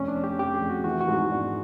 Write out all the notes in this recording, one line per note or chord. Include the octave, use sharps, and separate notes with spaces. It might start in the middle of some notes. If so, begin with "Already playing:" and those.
Already playing: F1 C#4
D4
F1
G4
F1 G4
G#4
F1
F#4
E3 F#4
F#4
G#2
D4